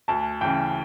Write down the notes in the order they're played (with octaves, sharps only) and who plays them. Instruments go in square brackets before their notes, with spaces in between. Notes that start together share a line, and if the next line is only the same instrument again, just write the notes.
[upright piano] D2 A5
C#3 E3 G5